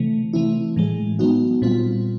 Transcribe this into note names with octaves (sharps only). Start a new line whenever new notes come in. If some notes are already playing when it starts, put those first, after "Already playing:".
Already playing: C3 E3 A3
E3 A3 C4 E4
A2 E3 G#3
F#3 B3 D#4 F#4
A#2 G3 C4 F4